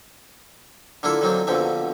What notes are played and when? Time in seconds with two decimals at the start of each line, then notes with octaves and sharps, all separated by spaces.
1.03 D3 A#3 D4 E4 F4 A4
1.21 D3 D#3 F#3 A#3 C4 D4
1.47 A#1 F2 B2 D3 C4 E5